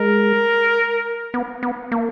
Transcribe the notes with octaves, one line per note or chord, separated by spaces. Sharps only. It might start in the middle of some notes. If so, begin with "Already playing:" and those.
Already playing: G#3 A#4
B3
B3
A#3